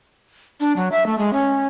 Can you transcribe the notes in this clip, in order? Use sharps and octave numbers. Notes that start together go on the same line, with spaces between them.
D4
F#3
E5
A3
G#3
C#4